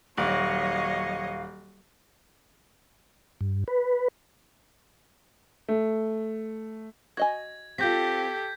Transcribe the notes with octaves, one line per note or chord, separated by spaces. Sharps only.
D#1 F#3 C#5 D#5 F5
G2
B4
A3
F#4 D#5 G#5 G#6
C4 F4 G4 A4 G6 A#6 B6